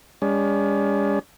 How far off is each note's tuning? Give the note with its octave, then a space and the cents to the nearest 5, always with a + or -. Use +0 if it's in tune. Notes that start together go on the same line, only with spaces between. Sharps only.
G#3 -45 C#4 +45